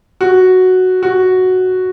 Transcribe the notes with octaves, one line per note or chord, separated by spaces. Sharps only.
F#4
F#4